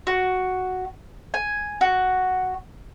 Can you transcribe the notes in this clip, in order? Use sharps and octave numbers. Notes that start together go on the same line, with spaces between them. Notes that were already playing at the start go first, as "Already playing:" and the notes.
F#4
G#5
F#4